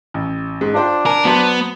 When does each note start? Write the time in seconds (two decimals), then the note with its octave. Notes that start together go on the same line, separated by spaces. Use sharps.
0.14 A1
0.61 G#2
0.75 D4 F4 C5 G5
1.06 A#4 G#5
1.25 F#3 B3 C5